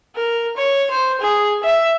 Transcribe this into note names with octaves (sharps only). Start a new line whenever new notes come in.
A#4
C#5
C5
G#4
E5